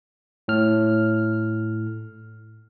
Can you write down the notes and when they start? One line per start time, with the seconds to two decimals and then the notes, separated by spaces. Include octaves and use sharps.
0.48 A2 F6